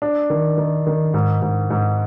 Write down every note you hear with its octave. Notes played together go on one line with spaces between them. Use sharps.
D4
D#3
D#3
D#3
G#2
G#2
G#2